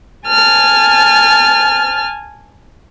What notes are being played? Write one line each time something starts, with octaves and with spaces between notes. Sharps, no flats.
G#5 A5 F6